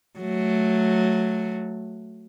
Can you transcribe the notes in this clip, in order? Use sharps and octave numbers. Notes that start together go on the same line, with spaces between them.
F#3 A3